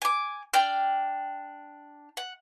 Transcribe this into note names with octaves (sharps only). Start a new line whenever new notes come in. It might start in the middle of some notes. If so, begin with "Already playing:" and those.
G#5 D6
D4 G5 F6
F#5